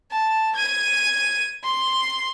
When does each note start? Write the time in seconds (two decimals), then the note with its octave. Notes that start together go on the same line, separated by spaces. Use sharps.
0.11 A5
0.56 G#6 D#7
1.64 C6